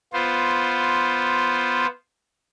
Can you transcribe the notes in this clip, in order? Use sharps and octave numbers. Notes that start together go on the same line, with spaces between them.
B3 F4 C5